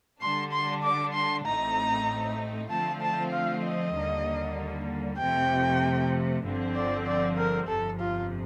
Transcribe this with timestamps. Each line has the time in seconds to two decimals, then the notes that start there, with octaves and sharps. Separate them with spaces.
0.21 D3 G3 D4 C6
0.52 C6
0.83 D6
1.14 C6
1.46 A1 A2 A3 C4 D#4 A#5
2.70 D3 F3 A3 C4 F4 A5
3.01 A5
3.33 F5
3.64 D#5
3.95 D#2 D3 G3 A#3
5.19 F2 C3 F3 A3 G5
6.44 G1 G2 D3 F3 C4
6.75 D5
7.06 D5
7.38 A#4
7.68 G1 F2 C3 F3 A4
8.00 F4